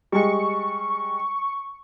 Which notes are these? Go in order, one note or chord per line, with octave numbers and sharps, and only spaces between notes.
G3 G#3 C#6